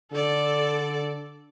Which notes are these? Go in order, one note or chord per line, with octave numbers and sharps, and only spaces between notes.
D3 A4 D5